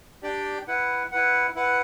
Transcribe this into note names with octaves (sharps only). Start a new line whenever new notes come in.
D4 G4 D5 G5
E4 B4 F#5
E4 B4 F#5
E4 B4 F#5